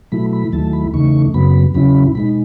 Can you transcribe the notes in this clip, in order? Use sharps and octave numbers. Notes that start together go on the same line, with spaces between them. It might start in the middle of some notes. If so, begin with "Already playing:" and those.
B2 F#3 A3 E4 B5
B5
D#2 D#3 F#3 A3 E4 A5
B5
E2 C#3 E3 A3 D#4 C#6
F#2 C#3 F#3 B3 B5
E2 C#3 F#3 C#4 E4 B5
B2 G#3 D#4 B5